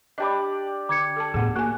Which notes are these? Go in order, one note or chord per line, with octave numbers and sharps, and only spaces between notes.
D4 G4 D5 D#5 A5 B5
D3 D6 G#6 C#7
A4 A5
D2 A2 B3 G#4 F#5
A#3 F#4 A#4 G#5 F#6